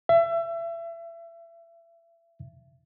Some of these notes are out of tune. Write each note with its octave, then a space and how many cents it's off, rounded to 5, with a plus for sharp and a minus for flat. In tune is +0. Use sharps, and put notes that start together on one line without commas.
E5 +30